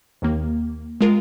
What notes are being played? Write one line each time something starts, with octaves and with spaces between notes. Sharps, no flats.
D#2 D#3 A#3
G#3 F4 A#4